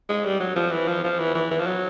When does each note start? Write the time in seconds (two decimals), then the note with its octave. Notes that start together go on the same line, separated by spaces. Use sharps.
0.09 G#3
0.25 G3
0.40 F#3
0.56 F3
0.72 E3
0.88 F3
1.04 F3
1.19 E3
1.35 E3
1.51 E3
1.60 F3
1.67 F#3